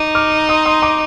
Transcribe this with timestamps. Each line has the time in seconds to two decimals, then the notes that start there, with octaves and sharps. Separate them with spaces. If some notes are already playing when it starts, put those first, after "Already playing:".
Already playing: D#4 D6
0.15 D6 F6
0.49 C6 D#6
0.66 C6 D#6
0.82 A#5 D6